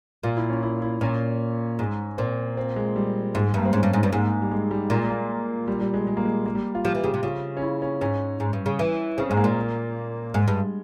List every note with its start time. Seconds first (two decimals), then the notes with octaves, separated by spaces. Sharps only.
0.23 A#2 F4
0.37 E4
0.50 C#4
0.63 E4
0.82 E4
1.01 A#2 C#4
1.79 G#2
2.18 A#2 C4
2.57 C4
2.76 G#3
2.96 G3
3.34 G#2 G#3
3.49 G#3
3.54 G2 A#3
3.65 C4
3.73 G#2 C#4
3.83 G2
3.93 G#2
4.03 G2
4.12 G#2 A#3
4.42 G3
4.51 G#3
4.71 G3
4.90 A#2 G#3
5.10 A#3
5.68 G3
5.81 G3
5.94 G#3
6.07 G#3
6.17 A#3
6.25 G#3
6.46 A#3
6.55 G3
6.75 F4
6.84 F3 G4
6.95 E3
7.04 C#3 G4
7.14 C3
7.23 C#3 F4
7.57 C#4
7.62 E4
7.82 C#4
8.01 G#2 C#4
8.40 G#2
8.53 G2
8.66 C#3
8.79 E3
9.18 C#3 C4
9.29 G#2 G#3
9.37 A#3
9.44 A#2
10.34 G#2 G#3
10.48 G2